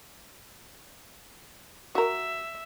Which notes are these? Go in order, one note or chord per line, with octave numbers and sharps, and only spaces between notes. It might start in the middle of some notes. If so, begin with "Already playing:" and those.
F#4 A#4 E5